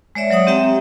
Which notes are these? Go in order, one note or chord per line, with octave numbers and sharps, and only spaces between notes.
G#3 C#5 D5 E5
F#3 C#5 F#5 D#6
C4 G4 E5 G5 A#5